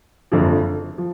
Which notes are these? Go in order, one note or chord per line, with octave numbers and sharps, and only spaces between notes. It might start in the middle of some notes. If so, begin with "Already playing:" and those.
F#1 F2 D3 F3
F3